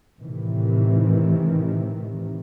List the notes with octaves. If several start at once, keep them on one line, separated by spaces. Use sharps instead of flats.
A2 C3 D#3 E3